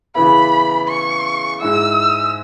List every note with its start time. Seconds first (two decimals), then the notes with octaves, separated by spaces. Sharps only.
0.15 C#3 E3 B3 E4 B5
0.88 C#6
1.61 G#2 G#3 E4 E6